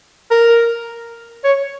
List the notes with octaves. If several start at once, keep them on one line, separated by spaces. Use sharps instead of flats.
A#4
C#5